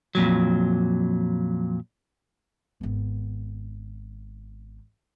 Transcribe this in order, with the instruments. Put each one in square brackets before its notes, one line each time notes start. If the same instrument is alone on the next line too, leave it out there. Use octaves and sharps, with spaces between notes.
[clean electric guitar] F2 A#2 F#3
[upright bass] G#1 B3